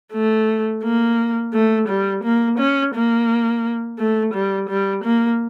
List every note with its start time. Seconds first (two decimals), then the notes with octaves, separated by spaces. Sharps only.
0.13 A3
0.83 A#3
1.53 A3
1.88 G3
2.23 A#3
2.58 C#4
2.94 A#3
3.98 A3
4.34 G3
4.69 G3
5.04 A#3